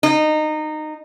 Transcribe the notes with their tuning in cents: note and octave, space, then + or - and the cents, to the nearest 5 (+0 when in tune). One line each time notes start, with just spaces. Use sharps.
D#4 -20